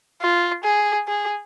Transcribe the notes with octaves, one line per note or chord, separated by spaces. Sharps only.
F4
G#4
G#4